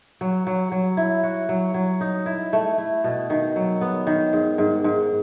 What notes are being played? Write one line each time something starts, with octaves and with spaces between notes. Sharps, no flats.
F#3
F#3
F#3
E4
F#4
F#3
F#3
D#4
E4
A3
E4
B2
D#3
F#3
B3
D#3
G#2
G#2
G#2